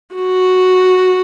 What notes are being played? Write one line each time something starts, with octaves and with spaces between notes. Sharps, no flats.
F#4